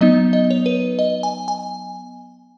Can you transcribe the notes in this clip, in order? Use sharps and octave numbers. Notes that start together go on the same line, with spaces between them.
F#3 B3 D#4 D#5
D#5
C#5
B4
D#5
G#5
G#5